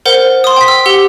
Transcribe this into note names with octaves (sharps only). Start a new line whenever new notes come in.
A#4 C5 F#5
C6 D#6
G5 B6
E6
G4 F#5 G7